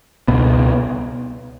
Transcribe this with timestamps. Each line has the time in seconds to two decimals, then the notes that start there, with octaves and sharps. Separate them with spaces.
0.28 C#2 B2 B3